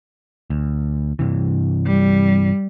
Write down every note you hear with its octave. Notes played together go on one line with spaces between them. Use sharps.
D2
G2 C3 E3
G3